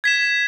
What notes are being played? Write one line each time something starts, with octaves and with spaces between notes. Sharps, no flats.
G#6 B6 E7